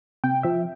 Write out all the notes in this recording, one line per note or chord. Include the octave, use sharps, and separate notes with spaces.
C3 G5
F3 E5